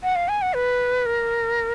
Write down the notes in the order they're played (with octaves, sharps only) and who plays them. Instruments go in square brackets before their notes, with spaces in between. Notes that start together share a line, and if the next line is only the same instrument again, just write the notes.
[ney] F#5
F5
G#5
F#5
B4
A#4